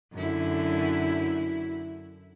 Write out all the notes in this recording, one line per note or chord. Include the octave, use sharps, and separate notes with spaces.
F#2 D3 E4